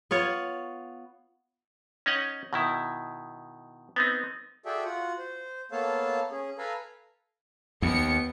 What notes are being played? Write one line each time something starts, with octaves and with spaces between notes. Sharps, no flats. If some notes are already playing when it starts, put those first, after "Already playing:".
B3 F4 C#5
C#4 D#4 C#5 D#5 F#5
B2 D#3 E4
B3 C4 D#4
F#4 G#4 A4 D5 E5 G5
F4 F#4 F#5
C5
A#3 B3 A4 C#5 F5 A5
C#4 G#4
A4 B4 F5 G#5 A#5
D#2 B3 C#7